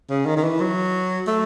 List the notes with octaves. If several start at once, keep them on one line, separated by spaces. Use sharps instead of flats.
C#3
D#3
D#3
E3
F#3
A3